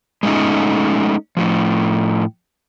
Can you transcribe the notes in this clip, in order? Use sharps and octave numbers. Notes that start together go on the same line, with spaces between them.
G#3 A3 B3 C#4 D#4
A2 F3